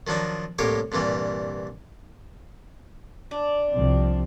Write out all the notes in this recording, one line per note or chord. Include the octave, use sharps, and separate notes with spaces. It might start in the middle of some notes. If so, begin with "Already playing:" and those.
D#3 F3 F#3 D4 D#4
C2 A2 A#3 G4 C#5 G5
C2 G2 A#2 E3 G3
D4
C2 F3 C4